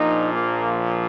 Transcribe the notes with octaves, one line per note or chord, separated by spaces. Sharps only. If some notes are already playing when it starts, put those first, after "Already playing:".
Already playing: A#1 A#2 F3 D#4
A#3